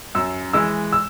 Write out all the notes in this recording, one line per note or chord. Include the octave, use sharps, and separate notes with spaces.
F#2 E6
E3 G#3 E6
E6